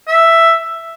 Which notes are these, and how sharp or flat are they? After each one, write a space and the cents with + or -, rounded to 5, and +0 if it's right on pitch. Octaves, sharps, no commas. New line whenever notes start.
E5 +5